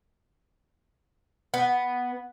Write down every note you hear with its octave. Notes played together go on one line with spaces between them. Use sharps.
B3